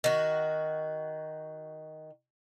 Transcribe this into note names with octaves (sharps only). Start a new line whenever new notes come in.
D#3 F#4